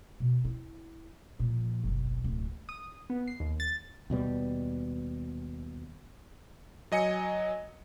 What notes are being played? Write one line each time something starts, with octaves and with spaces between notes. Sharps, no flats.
B2
E4
A#2 F3
F#1 B1
D1
D#6
B3
C7
D#2
A6
D#2 B2 G3 B3
F#3 D#5 G#5 C#7